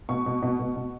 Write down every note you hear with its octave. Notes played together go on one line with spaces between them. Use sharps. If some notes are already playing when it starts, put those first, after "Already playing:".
B2 C#6
B2
B2
B2
B2